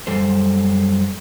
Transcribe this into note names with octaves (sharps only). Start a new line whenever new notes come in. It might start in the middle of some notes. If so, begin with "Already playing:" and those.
F#2 G3 A4 C5